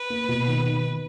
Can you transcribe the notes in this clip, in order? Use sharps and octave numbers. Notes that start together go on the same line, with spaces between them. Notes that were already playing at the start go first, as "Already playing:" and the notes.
Already playing: B4
A#3
B2
D#3
D#3